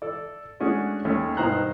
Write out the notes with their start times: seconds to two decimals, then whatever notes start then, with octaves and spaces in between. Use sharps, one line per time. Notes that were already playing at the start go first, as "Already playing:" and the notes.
0.02 A4 D5
0.60 G#3 A3 C#4 D4 F#4 G#4
1.05 D#2 A3 C#4
1.37 G2 B2 D#3 C5 A#5 F#6